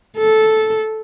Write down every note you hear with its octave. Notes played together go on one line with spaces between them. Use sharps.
A4